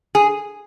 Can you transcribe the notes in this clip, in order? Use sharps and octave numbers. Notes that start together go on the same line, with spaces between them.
G#4